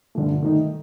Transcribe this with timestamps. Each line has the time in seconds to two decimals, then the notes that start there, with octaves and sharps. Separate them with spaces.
0.15 G2 D3 F3 A3
0.42 D#3 A3 D#4